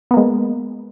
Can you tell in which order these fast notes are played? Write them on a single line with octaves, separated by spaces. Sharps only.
B3 A#3 G#3